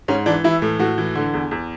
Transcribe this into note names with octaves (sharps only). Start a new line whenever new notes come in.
G#2 C#4
E3 D4
E3 E4
A2
A2 F#4
E3
D3
E2
E2